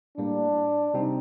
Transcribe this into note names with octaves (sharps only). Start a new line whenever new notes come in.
A2 G3 A#3 D4
C3 G3 C4 D#4